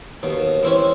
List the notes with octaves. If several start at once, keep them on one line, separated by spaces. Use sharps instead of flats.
D#2 B2
E3 C4 C#4